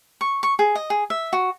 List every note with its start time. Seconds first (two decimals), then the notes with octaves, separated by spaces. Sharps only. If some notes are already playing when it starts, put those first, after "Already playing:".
0.21 C#6
0.43 C#6
0.59 G#4
0.75 D#5
0.90 G#4
1.10 E5
1.33 F#4